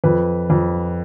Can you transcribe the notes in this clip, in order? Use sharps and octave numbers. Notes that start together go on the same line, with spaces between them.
F2 B4
F2